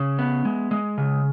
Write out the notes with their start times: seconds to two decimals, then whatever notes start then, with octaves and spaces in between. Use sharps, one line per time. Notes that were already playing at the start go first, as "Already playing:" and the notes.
Already playing: C#3
0.19 B3
0.45 G#3
0.71 G#3
0.98 C#3